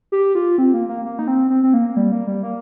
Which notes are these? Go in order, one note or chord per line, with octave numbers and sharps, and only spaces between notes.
G4
F4
C4
A#3
A#3
A#3
D#4
C4
C4
C4
A#3
G3
A#3
G3
A#3